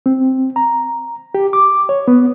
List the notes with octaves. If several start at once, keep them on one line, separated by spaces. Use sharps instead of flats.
C4
A#5
G4
D6
C#5
B3